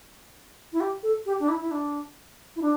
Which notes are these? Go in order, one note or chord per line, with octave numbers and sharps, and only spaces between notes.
E4
G4
A4
G4
D4
E4
E4
D4
E4
D4